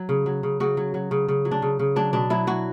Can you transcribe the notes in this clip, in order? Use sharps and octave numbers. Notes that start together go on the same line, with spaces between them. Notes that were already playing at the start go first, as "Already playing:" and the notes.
Already playing: F#3
C#3
F#3
C#3
C#3 F#4
F#3
F#3
C#3
C#3
F#3
D4
C#3
C#3
F#3 D4
B2 D4
F#3 E4
F#3 F#4